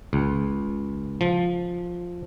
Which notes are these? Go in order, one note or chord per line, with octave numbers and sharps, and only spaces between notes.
C#2
F3